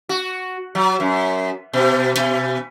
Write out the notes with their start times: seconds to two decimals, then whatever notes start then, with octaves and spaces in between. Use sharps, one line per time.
0.09 F#4
0.75 F#3
1.00 F#2
1.73 B2
2.17 B2